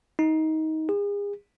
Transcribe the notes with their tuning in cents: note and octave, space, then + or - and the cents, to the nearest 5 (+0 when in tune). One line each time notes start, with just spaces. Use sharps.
D#4 +20
G#4 -40